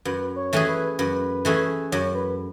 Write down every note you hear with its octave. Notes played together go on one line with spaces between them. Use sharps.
F#2 B4
C#5
E3 A3 C#4 G#4
B4
F#2 B4
E3 A3 C#4 G#4
F#2 C#5
B4